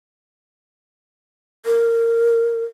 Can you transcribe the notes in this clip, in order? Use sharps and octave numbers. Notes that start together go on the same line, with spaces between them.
A#4